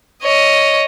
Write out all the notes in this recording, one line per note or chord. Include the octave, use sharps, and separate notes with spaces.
C#5 D#5